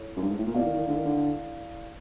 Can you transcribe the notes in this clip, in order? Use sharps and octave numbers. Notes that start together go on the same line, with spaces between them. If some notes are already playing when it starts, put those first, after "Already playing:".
Already playing: E4 A4 C#5
F#2
G2
G#2
A2
A#2
B2 E4 A4 D5 F5
D#3
D#3
D3
D#3
D3